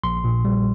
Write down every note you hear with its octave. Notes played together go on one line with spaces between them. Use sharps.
A#1 C6
A#2
G3